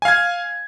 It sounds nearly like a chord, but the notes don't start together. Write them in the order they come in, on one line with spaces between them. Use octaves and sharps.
G#5 F5 G#6